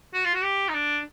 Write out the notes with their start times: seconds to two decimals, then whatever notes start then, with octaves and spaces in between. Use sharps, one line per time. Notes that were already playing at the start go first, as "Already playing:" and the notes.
0.14 F#4
0.25 F4
0.34 F#4
0.43 G4
0.69 D#4
0.74 D4